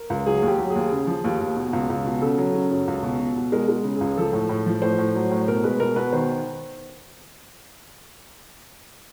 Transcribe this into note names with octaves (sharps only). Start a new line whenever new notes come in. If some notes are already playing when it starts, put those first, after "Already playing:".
Already playing: A#4
C#2
F#3 G#4
D#2
G4
F#3
G#4
D#2
C#3
F3
D#2
D#2
B2
C#2
C#2
B2
C#3 A4
F#3
C#3
F#2
C#2
B2
B2
B2
G#3 A#4
G#3
C#3
C#2 G#4
F3 A4
A2
A2
F3
A2 C5
A2
F#3
A2
B2 A#4
G#3 B4
B2 A#4
B2 B4
D#3 C5